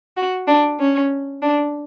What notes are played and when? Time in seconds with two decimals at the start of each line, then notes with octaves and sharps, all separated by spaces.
0.17 F#4
0.47 D4
0.79 C#4
1.42 D4